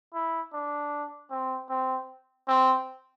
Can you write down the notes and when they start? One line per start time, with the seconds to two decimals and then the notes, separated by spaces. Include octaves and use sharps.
0.14 E4
0.53 D4
1.30 C4
1.69 C4
2.48 C4